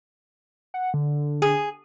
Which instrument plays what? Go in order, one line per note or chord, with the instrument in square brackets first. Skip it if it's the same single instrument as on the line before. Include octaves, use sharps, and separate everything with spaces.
[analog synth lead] F#5
D3
[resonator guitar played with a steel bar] G#4